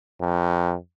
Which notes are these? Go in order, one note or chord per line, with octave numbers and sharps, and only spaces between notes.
F2